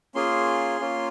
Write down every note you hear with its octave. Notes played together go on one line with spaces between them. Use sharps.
A#3 C#4 F4 G#4 C6
A#3 C#4 F4